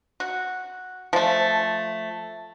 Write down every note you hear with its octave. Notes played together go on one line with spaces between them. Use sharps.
F#4
F3 A3